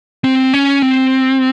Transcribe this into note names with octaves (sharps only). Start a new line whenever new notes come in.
C4
C#4
C4